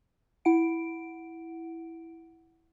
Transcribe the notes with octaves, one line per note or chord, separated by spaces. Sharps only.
E4 F#5 D7